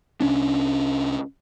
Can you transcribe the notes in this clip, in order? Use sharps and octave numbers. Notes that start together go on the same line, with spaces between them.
C2 C#4 D4